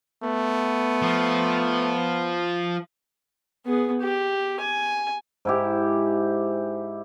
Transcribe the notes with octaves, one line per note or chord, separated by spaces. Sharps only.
A3 B3
F3
B3 G#4
G4
G#5
G#2 E4 G4